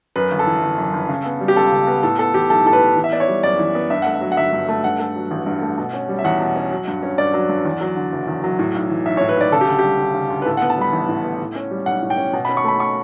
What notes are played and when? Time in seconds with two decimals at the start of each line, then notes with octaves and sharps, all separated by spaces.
0.16 F#2 B4
0.31 G1
0.39 A4
0.47 E3
0.63 G1
0.78 F#2
0.93 G1
1.09 C#3
1.26 B3
1.41 G3
1.48 G4
1.56 C#2 A4
1.72 C#3
1.87 B3
2.03 A2 A4
2.19 B3 A4
2.34 E3 G4
2.50 B1 A4
2.65 A2 A4
2.73 B4
2.81 B3
2.96 E3
3.04 E5
3.12 B3 D5
3.20 C#5
3.28 G3
3.43 F#2 D5
3.59 E3
3.75 B3
3.90 G2 E5
4.02 A3 F#5
4.14 E5
4.21 F#3
4.32 F#5
4.37 G1 E5
4.53 G2
4.69 A3
4.84 G2 F#5
4.99 A3
5.16 F#3
5.31 A1
5.46 G2
5.62 A3
5.78 B2
5.93 C#4
6.09 G3
6.19 E5
6.24 E2 F#5
6.40 B2
6.56 C#4
6.71 F#3
6.87 G2
7.03 C#4
7.18 G2 D5
7.34 F#3
7.49 G2
7.65 E2
7.81 F#3
7.96 D3
8.12 F#1
8.27 E2
8.44 F#3
8.59 A2
8.74 B1
8.90 E3
9.05 B1 E5
9.17 A2 C#5
9.29 B4
9.37 B1 D5
9.52 C#3 A4
9.61 G4
9.68 D2
9.79 G3 G4
10.00 D2
10.15 C#3
10.30 D2
10.42 B4
10.46 A2 A4
10.57 B3 F#5
10.70 A5
10.78 G3 B5
10.93 A1
11.08 A2
11.24 B3
11.39 A2
11.55 C#4
11.71 G3
11.86 B1 F#5
12.02 A2
12.10 G5
12.17 C#4
12.33 B2
12.45 C#4 B5
12.57 C#6
12.64 A3 B5
12.80 C#6